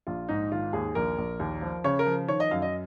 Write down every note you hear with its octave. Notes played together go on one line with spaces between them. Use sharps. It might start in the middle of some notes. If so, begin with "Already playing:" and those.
A#1 F4
G#2 D#4
D#3 F4
D#2 G#4
A#1 A#4
A#1
D#2
F3
C#3 C#5
A#4
F3
D#3 C#5
D#5
F#2 F5
D#5